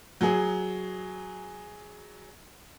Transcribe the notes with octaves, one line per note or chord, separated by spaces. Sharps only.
F#3 G#4